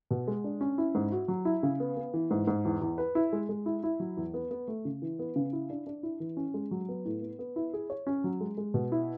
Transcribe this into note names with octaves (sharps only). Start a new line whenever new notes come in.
B2
G#3
D4
C#4
E4
G#2
F#4
F#3
E4
C#3
B3
B3
E3
G#2
G#2
E2
E2
B4
E4
G#3
G#3
E4
E4
F#3
E2
B3
B3
A3
C#3
E3
B3
C#3
E4
D4
D4
E4
E3
C#4
G#3
F#3
B3
A2
B3
B3
E4
G#4
C#5
C#4
F#3
G#3
G#3
B2
E4